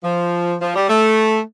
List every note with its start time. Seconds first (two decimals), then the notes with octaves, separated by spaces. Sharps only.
0.04 F3
0.61 F3
0.76 G3
0.89 A3